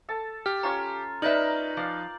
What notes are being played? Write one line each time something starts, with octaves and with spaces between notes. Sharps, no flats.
A4 A5
G4 F6
C#4 F4 C#5 A#5
D#4 A#4 B4 D5 E5 G6 F#7
F3 D5 F5